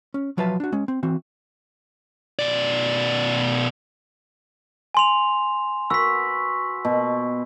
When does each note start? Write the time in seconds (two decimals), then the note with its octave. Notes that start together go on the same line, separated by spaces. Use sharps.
0.14 C#4
0.37 F3 F#3 F4 B4 E5 A5
0.60 D4 F#4
0.72 G#3 C#4
0.88 C4
1.03 E3 C4 F#4
2.39 B2 D5
4.94 G#5 C6 F7
5.90 F#4 B4 E6 B6
6.85 B2